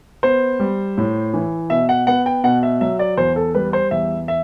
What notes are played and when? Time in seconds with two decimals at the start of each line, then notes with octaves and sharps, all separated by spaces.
0.23 B3 C5
0.60 G3
0.98 A2
1.34 E3
1.70 B2 E5
1.89 F#5
2.07 B3 F#5
2.26 G5
2.44 B2 F#5
2.63 E5
2.81 F#3 E5
2.99 D5
3.17 E2 C5
3.36 A4
3.55 G3 B4
3.73 C5
3.91 E2 E5
4.28 E5